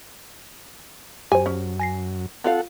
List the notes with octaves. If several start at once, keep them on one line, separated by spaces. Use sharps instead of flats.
F#2 G4 C5 G#5
C#4
G#5 A#6 C7
C4 F4 A4 F5 F#5